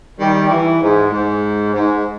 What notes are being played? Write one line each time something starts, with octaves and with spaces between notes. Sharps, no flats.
D#3 G3
E3
G#2
G#2
G#2